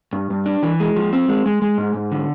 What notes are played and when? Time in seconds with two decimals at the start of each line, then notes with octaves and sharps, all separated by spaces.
0.13 G2
0.30 G2
0.46 D4
0.63 E3
0.80 G#3
0.96 F3
1.13 C4
1.29 G#3
1.46 G#3
1.62 G#3
1.78 G#2
1.94 G#2
2.11 D3